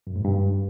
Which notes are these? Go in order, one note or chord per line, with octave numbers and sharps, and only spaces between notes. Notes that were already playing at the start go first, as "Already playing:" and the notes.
F#2
G#2
G2